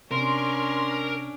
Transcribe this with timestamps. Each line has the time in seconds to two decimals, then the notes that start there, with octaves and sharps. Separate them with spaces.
0.11 C3 C#4 D4 A#4 C6